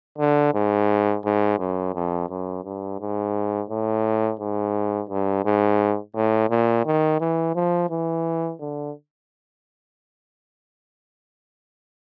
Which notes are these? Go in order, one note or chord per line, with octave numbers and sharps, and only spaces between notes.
D3
G#2
G#2
F#2
F2
F#2
G2
G#2
A2
G#2
G2
G#2
A2
A#2
D#3
E3
F3
E3
D3